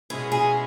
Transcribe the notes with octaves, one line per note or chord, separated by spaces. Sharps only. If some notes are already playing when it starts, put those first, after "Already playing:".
B2 G#3 C#4 E4 G#4
G#4